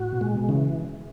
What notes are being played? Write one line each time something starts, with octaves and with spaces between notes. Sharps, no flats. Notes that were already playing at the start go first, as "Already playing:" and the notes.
Already playing: A2 F#4
B2
A#2 G#3
B2
C#3 E3